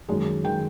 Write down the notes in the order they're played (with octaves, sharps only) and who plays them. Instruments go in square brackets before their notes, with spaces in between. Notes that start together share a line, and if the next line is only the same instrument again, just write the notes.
[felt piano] F#2 D#3 G#3
D#3 G#3 G5